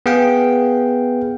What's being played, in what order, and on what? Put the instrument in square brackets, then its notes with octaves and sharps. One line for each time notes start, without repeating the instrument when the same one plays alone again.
[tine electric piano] B3 G#4 F5 G5